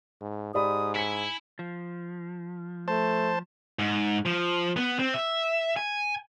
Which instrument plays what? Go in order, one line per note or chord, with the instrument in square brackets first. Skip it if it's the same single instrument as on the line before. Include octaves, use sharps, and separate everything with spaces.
[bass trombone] G#2
[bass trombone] G#2 [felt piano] G4 D5 B5 [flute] D#6
[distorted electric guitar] E4 [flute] G#5 [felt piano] B6 C#7
[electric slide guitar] F3
[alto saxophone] A3 [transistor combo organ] C5 A5
[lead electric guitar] G#2
F3
B3
C4
E5
G#5